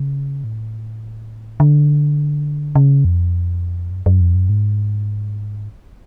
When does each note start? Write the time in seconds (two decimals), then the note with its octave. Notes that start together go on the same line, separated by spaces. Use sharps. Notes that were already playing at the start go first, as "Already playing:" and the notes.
Already playing: C#3
0.44 A2
1.60 D3
2.76 C#3
3.05 F2
3.91 F#2
4.06 F#2
4.21 F2
4.35 F#2
4.49 G#2